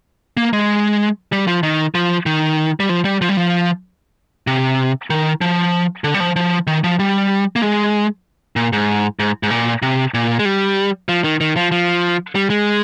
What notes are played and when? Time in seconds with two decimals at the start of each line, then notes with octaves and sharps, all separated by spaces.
0.37 A#3
0.53 G#3
1.33 G3
1.47 F3
1.63 D#3
1.95 F3
2.26 D#3
2.80 G3
2.89 F3
3.05 G3
3.21 F3
3.29 G3
3.37 F3
4.47 C3
5.10 D#3
5.41 F3
6.04 D3
6.14 G3
6.20 F3
6.36 F3
6.67 D#3
6.84 F3
6.99 G3
7.56 A#3
7.62 G#3
8.56 A#2
8.73 G#2
9.19 G#2
9.43 G#2
9.50 A#2
9.82 C3
10.14 A#2
10.39 G#3
10.45 G3
11.09 F3
11.24 D#3
11.41 D#3
11.56 F3
11.72 F3
12.35 G3
12.50 G#3